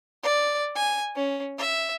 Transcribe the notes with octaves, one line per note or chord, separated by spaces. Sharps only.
D5
G#5
C#4
E5